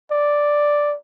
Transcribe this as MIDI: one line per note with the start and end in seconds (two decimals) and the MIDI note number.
0.11 0.96 74